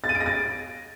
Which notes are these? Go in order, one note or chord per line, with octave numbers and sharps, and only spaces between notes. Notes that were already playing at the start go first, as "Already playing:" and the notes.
A6
D#7
D7
A#6
A6